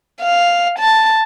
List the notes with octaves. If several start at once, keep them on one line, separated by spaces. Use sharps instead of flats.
F5
A5